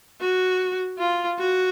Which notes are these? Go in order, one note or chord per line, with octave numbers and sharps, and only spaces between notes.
F#4
F4
F#4